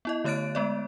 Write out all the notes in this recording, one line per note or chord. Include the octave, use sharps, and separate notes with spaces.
B3 E4 D#5
D3 A3 C#5 F#6 A6 D7
G#3 B3 D5